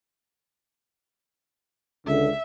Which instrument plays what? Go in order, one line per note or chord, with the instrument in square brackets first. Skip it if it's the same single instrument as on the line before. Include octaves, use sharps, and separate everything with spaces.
[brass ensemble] C#2 D3 [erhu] E5